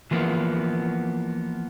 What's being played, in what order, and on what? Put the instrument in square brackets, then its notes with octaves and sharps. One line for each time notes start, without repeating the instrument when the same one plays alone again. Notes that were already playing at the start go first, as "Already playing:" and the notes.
[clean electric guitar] E3 F3 A#3 B3